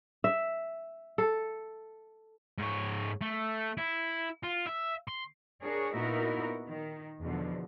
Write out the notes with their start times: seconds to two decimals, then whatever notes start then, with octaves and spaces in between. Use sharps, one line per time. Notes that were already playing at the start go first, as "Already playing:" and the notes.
0.24 E5
1.18 A4
2.58 G#2 C#5
3.21 A3
3.77 E4
4.44 F4
4.67 E5
5.08 C6
5.62 D4 G#4 A#4 C#5
5.94 A#2 B3 D#4 E4 F#4 A#4
6.68 D#3
7.22 E2 B2 D3 F3